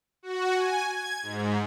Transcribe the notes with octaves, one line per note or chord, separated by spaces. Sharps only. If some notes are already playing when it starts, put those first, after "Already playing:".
F#4
G#5
G#6
G#2